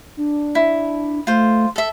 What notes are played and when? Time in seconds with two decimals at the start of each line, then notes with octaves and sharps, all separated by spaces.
0.17 D4
0.55 E4
1.27 A3 F4 C5
1.76 A4 E5